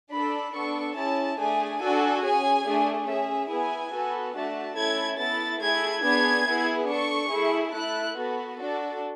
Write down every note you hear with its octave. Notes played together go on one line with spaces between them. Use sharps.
D4 A4 B5
B3 D4 A4 C#6
C#4 E4 G#4 A5
A3 D4 G#4 G#5
D4 F#4 A4 G#5
C#4 G#4 G#5
A3 D4 G#4
C#4 G#4 E5
B3 E4 G#4 G#5
B3 F#4 A4
A3 D4 F#4 A5
A3 C#4 E4 A4 G#6
B3 E4 A4 A6
A3 E4 G#4 G#6
B3 D4 G#4 G#6
B3 E4 G#4
D4 A4 C#6
A3 E4 G#4
A3 E4 A4 F#6
B3 F#4 A4
D4 F#4 A4